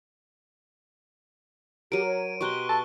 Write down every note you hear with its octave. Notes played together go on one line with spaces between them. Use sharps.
F#3 G4 A#4 D7 D#7
C#5
B2 G4 A#5 C6 C#6 F#6 G7
A5